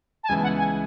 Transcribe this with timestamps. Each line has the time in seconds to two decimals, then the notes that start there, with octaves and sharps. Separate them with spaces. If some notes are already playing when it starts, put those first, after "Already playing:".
0.23 A5
0.28 C#2 C#3 E3 B3 G#5
0.43 F#5
0.58 G#5